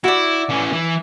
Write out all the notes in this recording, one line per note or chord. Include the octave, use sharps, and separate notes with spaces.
E4 F#4 D5
E3 C#4
E3